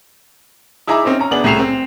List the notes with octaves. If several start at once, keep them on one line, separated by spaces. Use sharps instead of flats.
D#4 E4 G#4 E5 A#5 D6
C4 C#4 D#4 C5
C#4 A#5
D2 B3 D4 G#4 F#7
C2 A2 G#4 C7 E7 F7
C4